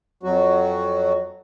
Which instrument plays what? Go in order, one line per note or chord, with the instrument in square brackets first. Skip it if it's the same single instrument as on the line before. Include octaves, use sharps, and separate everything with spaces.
[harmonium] F2 F#3 F#4